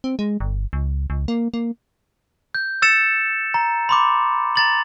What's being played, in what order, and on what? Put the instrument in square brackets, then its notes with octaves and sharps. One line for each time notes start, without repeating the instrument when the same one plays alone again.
[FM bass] C4
G#3
G1
C#2
C#2
A#3
A#3
[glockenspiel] G6
E6 A6 C#7 E7
A#5
B5 C6 D6
A#5 A6 F#7